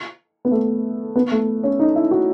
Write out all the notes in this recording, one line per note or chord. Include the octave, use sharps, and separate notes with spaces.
B3
A3
B3
A3
C#4
D#4
E4
F#4